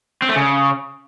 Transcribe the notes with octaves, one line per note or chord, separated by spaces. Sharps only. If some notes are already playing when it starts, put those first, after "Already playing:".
C4
A3
C#3